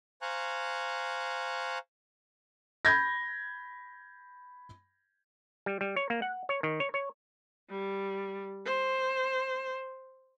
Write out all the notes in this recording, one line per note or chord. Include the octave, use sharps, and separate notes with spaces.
C5 F5 G#5 A#5 C#6 F#6
B5 G6 G#6 A#6
G3
G3
C#5
A#3
F#5
C#5
D#3
C#5
C#5
G3
C5